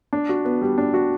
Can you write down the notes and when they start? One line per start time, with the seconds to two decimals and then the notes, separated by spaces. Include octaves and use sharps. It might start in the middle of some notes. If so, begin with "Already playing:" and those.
0.13 D4
0.29 F#4
0.45 B3
0.61 G3
0.78 D4
0.94 F#4